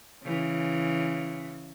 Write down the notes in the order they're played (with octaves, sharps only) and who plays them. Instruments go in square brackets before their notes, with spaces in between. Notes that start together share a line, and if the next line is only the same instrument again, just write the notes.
[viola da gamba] C#3 E3